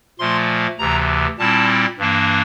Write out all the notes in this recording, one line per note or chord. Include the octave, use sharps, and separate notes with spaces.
A#2 F3 A3 C6
D2 C3 E3 A#5
A#2 G3 C4 E4 A5
G2 E3 A#3 D4